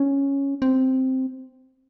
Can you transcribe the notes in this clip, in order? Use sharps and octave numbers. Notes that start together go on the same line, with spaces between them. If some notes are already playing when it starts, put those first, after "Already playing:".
Already playing: C#4
C4